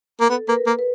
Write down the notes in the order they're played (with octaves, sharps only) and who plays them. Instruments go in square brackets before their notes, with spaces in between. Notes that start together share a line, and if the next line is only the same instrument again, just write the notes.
[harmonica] A#3
[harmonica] B3 [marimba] A4
[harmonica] A#3 [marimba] B4
[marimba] A#4
[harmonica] A#3
[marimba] B4